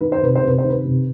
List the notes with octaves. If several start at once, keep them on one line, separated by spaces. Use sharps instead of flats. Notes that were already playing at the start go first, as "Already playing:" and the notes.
D#3 B4
C5
C3 B4
C5
C3 B4
C5
D#3
B4
C3